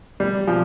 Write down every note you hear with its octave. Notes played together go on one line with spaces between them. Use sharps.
G3
F3